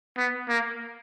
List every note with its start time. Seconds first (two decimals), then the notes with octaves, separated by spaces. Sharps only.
0.17 B3
0.49 A#3